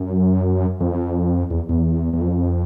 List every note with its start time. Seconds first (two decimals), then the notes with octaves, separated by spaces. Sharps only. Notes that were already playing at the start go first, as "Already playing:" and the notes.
Already playing: F#2
0.80 F2
1.51 E2
1.69 E2
2.14 E2
2.21 F2